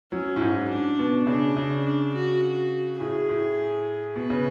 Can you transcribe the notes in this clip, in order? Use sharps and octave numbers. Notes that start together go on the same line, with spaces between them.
F#3 C#4
A2
G#2
D4
B2
C#3 D4
C#3
D4
F#4
F#4
A2 G#4
A2
B2 B4
C#3